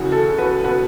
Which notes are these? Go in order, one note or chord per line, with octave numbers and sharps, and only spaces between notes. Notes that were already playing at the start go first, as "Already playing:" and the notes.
Already playing: F#2 C#3 E3 F#4
A4
F#4 B4
B2 F#4 B4